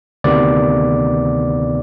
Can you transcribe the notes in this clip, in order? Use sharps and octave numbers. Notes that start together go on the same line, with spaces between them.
D2 C3 D#3 B3 D5